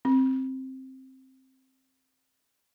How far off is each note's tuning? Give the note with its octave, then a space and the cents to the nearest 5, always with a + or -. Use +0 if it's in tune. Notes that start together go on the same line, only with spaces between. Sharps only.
C4 +10